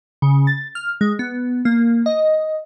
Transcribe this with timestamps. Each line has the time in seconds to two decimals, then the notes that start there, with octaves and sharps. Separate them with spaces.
0.22 C#3
0.47 A6
0.75 F6
1.01 G#3
1.19 B3
1.65 A#3
2.06 D#5